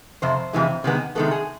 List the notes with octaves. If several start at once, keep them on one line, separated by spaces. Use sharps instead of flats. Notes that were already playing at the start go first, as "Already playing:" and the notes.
F2 C3 C5
F2 C3 E3 G#3
C3 D#3 G#3 B3
C3 D#3 G#3 B3 A4
G#4